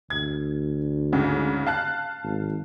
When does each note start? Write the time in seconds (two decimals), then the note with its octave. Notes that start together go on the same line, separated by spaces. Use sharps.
0.10 D2 G#6
1.13 G#2 C#3
1.67 F5 A5 F#6
2.24 G#1